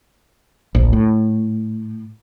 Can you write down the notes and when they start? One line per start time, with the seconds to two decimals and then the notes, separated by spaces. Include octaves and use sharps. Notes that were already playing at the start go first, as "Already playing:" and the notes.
0.75 D1 A#1
0.93 A2